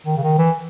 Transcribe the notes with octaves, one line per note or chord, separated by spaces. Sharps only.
D#3
C#3
D#3
E3